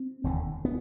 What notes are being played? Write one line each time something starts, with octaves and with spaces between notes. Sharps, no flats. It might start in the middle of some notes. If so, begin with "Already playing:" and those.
Already playing: C4
E1 D#2 D3
B3